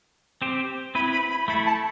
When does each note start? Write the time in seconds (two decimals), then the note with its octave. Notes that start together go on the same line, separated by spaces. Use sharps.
0.42 C4 G4 C5
0.95 C4 E4 B4 B5
1.13 B5
1.30 B5
1.48 A3 E4 A4 B5
1.66 A5